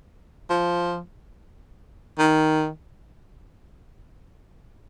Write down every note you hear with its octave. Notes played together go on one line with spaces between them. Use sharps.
F3
D#3